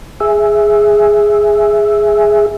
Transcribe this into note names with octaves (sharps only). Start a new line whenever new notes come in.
G#4 E5